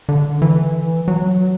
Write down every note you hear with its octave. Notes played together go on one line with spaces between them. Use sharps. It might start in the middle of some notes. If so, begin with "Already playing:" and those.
D3
E3
F#3